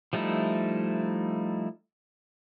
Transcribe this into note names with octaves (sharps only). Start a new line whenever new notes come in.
F3 G3 A3 D#4 E4